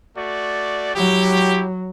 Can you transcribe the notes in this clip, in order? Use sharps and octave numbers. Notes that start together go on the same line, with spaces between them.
A3 F#4 D5
F#3 E4 F#4 G4